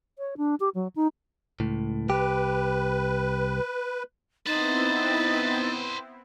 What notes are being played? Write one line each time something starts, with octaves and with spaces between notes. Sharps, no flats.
C#5
D4
G4
F#3
D#4
C#2 A2
C2 G4 B4
B3 C4 D#4 E4 B4 C5 A6